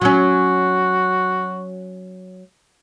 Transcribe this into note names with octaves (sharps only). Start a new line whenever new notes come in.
F#3 C#4 F#4